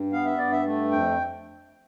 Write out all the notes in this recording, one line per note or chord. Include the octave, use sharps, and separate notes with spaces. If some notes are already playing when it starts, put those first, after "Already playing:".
Already playing: G2
B3 F5
E5
G2 D5
E5
A3
F2 G5